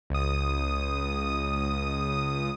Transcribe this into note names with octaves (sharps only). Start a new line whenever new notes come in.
C#2 D#6